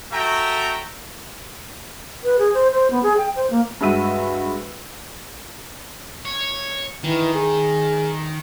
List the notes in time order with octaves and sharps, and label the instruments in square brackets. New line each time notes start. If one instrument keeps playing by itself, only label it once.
[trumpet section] F#4 A4 E5 G5 A#5
[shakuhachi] B4
G#4
C5
C5
B3
G#4
G5
C5
A#3
[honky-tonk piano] G2 G#3 F#4 E5 E6 D#7
[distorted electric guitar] C#5
[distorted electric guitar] D#3 [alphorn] E3
[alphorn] G#4